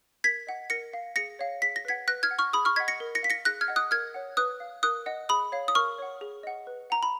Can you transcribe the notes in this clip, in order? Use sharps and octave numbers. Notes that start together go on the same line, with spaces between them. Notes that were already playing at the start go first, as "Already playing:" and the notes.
A#4 G#6 B6
D#5 F#5
A#4 A#6 C#7
F5
G#4 A#6 C#7
C#5 F5
G#4 B6
A#6
B4 F#5 G#6 B6
B4 F#6 A#6
F6 G#6
F#5
C#6 F6
G#4 B5 D#6
C#6 F6
D#5 F#5 G#6 B6
A#6 C#7
A#4
A#6 C#7
F5 B6
A#6 C#7
G#4 F#6 A#6
F6 G#6
D#5 F#5
D#6 F#6
A#4 F6 G#6
C#5 F#5
B4 D#6 F#6
F5
A#4 D#6 F#6
D#5 F#5
G#4 B5 D#6
C#5 F5
D#6
A#4 C#6 F6
C#5 F#5
G#4
D#5 F#5
B4
F#5 A#5
B5